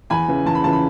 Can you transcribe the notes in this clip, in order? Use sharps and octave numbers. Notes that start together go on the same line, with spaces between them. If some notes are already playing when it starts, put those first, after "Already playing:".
E2 G#5 B5
C#3 E3
E2 A5
B5
C#3 E3 A5
B5